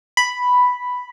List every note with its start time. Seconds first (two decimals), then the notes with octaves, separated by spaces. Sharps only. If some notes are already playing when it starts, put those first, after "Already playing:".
0.17 B5